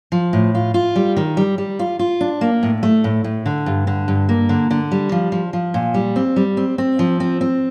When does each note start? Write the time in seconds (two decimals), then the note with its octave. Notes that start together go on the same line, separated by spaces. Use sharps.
0.12 F3
0.33 A2
0.55 F4
0.74 F4
0.96 G3
1.17 D#3
1.37 G3
1.58 G3
1.79 F4
1.99 F4
2.21 D4
2.41 A#3
2.63 A2
2.83 A3
3.04 A2
3.24 A2
3.46 D3
3.66 G2
3.87 D3
4.08 G2
4.29 A#3
4.49 D3
4.71 D3
4.92 G3
5.12 F3
5.32 F3
5.53 F3
5.74 A#2
5.94 G3
6.16 C4
6.36 G3
6.57 C4
6.78 C4
6.99 F3
7.20 C4
7.41 C4